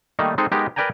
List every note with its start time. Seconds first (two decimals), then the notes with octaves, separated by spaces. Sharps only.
0.19 D#3 G3 A3 A#3 D#4
0.38 G#3 C4 D#4 G#4 A4
0.52 G#3 B3 D#4 G4 A#4
0.76 A#4 B4 D5 G5 G#5 A#5